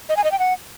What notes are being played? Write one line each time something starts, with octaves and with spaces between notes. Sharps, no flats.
D#5
G#5
D#5
G5
F#5